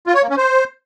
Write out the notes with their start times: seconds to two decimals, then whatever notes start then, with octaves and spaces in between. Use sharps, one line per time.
0.07 F4
0.15 C#5
0.22 A#3
0.30 C#4
0.37 C5